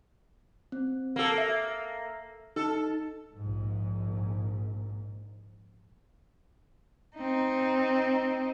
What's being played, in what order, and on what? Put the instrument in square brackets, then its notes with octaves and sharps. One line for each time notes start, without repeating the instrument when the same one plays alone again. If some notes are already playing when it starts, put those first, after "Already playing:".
[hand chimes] C4
[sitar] A#3 A4
[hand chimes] E5
[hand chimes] D#4 [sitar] A4
[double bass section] A#1 G#2
[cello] C4 D#4